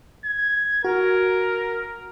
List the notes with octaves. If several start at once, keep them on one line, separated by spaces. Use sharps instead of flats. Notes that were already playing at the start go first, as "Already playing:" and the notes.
G#6
F#4 A#4